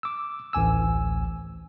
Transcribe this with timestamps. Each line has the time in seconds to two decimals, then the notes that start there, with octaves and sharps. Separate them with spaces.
0.03 D6 E6
0.53 A1 D2 G#5 E6